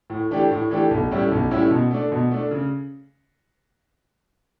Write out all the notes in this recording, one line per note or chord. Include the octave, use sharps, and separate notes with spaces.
A2
E3 A3 D4 G4
A2
E3 A3 D4 G4
B1
A2 G3 C#4 E4
B1
A2 G3 C#4 E4
B2
A3 D4
B2
A3 D4
C#3